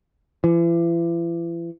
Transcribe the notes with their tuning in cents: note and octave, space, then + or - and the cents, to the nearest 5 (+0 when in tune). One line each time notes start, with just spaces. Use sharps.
E3 +40